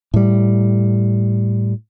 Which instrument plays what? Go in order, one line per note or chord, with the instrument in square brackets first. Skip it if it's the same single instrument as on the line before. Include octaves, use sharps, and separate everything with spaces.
[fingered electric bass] A2 G3